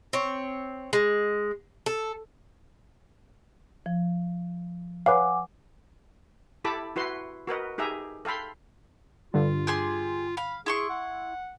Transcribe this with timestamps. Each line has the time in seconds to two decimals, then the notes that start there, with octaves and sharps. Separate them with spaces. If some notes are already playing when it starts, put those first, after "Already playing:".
0.13 C4 C#5
0.93 G#3
1.86 A4
3.86 F3
5.06 B4 C#5 F5 F#5 G#5 D6
6.65 E4 G4 A4 A5 B5 D6
6.96 E4 F#4 B4 C6
7.47 F#4 A#4 B4 D#5
7.78 D#4 G4 G#4 E5 A#5
8.25 A4 F5 G5 B5 C6
9.34 G2 D3 F4
9.67 G4 G#4 C6
10.37 F5 B5
10.66 E4 G#4 C6 C#6
10.89 F#5